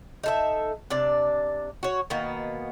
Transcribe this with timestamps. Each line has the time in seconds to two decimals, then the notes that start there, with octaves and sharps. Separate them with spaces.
0.24 D#4 A4 E5
0.90 C3 D4 D5
1.83 F#4 C#5
2.10 B2 D#3 A#3 B3